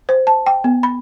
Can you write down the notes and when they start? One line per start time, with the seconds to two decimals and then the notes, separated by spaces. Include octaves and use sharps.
0.09 C5
0.27 A5
0.46 G5
0.64 B3
0.83 B5